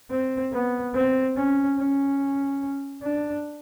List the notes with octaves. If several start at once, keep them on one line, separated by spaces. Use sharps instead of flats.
C4
B3
C4
C#4
C#4
D4